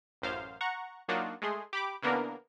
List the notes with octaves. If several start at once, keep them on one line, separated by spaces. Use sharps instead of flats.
A1 F#2 C5 F5
F#5 A#5 C#6
F#3 A#3 D4 D#4 F4 F#4
G#3 A3 G#4 C6
G4 B5 D6
C#3 E3 A#3 B3 D4 A#4